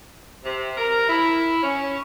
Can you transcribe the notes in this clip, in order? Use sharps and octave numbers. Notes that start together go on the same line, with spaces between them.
C3
A#4
E4
C#4